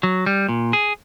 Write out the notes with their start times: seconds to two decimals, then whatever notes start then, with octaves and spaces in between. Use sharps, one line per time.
0.03 F#3
0.26 G3
0.49 A#2
0.73 G#4